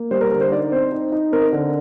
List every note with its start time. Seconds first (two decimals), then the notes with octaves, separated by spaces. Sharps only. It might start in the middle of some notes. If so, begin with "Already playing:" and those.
Already playing: A#3
0.11 G3 C5
0.21 A#4
0.31 D3 A#4
0.41 C5
0.51 D#4 D5
0.72 C4 C5
0.92 D#4
1.12 D#4
1.32 C4 A#4
1.52 D3